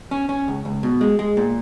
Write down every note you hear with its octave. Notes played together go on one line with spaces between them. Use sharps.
C#4
C#4
C#2
C#2
B2
G#3
G#3
A#2